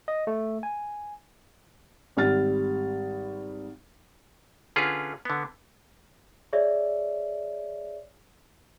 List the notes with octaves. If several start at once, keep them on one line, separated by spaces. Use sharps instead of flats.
D#5
A3
G#5
G#1 G3 F6 A6
D3 C#4 F4 G#4 B4
D3 B3
G#4 C#5 D5 E5